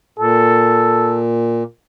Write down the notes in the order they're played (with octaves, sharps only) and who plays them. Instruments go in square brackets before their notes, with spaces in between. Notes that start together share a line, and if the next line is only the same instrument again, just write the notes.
[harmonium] A#2 [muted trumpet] A4